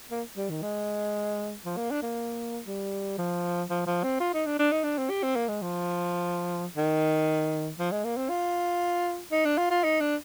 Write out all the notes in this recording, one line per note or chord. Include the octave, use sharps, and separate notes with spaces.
A#3
G3
D#3
G#3
F3
A#3
D4
A#3
G3
F3
F3
F3
C4
F4
D#4
D4
D4
D#4
D4
C4
G4
C4
A#3
G#3
F3
D#3
F3
G#3
A#3
C4
F4
D#4
D4
F4
F4
D#4
D4